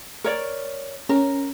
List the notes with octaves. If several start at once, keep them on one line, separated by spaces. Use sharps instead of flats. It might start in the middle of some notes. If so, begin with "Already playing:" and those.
A#4 C#5 D5
C#4 A#4